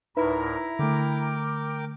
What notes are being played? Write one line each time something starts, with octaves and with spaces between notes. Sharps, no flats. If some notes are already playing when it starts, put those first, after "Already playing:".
D2 A2 D#4 E4 A#4 B4 E5 A#5
D3 A3 A#4 G5 D6